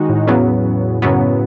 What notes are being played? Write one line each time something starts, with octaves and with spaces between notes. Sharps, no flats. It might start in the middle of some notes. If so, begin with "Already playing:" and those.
Already playing: D#3 G#3 D#4 F#4
A2
E2 C#3 F#3 B3
F#2 C#3 F#3 B3